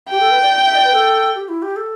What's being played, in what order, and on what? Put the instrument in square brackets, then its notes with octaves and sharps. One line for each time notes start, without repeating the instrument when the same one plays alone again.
[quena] G4 [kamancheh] G5
[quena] A4
B4
D5
E5
D5
B4
A4
G4
E4
G4
A4